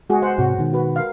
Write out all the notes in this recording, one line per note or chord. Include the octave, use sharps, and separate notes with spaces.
G#3 F#4 G#4
C5 F#5
G#2 C3 F#4
B2 D#3
F#4 B4
A#4 F5